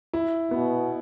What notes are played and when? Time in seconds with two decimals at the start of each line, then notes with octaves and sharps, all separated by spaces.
0.13 E4
0.51 B2 B3